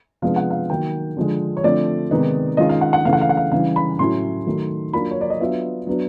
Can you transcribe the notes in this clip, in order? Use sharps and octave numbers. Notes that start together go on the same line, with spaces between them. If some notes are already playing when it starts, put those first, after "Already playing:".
C3 F3 G#3 B3 D4 F5
F#5
F5
D#3 F#3 A#3 G5
D3 F3 G#3
C#5
D3 F3 A3 C4 D5
C3 D#3 G#3 B3 D#4
D#3 G#3 C#4 F4 D#5
F5
F#5
F#5
C#3 E3 A3 F5
F#5
F5
F#5
F5
C#3 E3 G3 F5
B5
A2 F#3 A3 C#4 E4 C6
D#3 F#3 A3
F#3 A#3 D4 F4 B5
C#5
D5
D#5
F#3 B3 D4 F4 E5
F#3 B3 D4